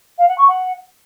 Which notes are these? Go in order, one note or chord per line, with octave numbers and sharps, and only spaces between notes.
F5
F#5
C#6
F#5